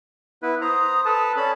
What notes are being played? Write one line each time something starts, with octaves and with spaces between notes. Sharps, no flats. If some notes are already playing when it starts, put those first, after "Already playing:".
B3 E4 B4
C5 A#5 D#6
A4 B4 A5
C#4 D5 A5 B5